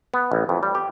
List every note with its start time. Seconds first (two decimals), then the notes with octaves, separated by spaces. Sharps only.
0.14 B3
0.32 A1
0.49 F2
0.63 G3
0.75 G4